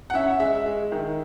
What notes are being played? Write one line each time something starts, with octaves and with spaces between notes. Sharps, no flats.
F#5
C#4 E5
G#3 E5
G#3
D#3